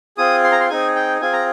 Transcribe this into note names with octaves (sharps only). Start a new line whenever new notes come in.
C4 F4 G#4 D#6
C6
A#5
C6
C4 D#4 G#4 G#5
G5
C4 F4 G#4 G#5
A#5